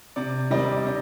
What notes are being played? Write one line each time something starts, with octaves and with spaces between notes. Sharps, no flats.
C3 D5
D#3 G3 C4 D#4 D#5
D5
D5
C3 D#5